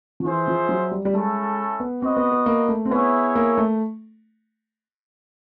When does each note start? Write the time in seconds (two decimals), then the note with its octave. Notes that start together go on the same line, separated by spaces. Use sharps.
0.20 F3
0.24 E3 F4 G#4 C5 E5
0.48 F3
0.69 F#3
0.91 G3
1.05 G3
1.14 G#3 A3 C#4 E4 A4
1.80 B3
2.02 C4 F#4 B4 D#5
2.17 B3
2.32 B3
2.46 A#3
2.68 A3
2.85 C4
2.91 B3 E4 G#4 C#5 E5
3.36 A#3
3.58 A3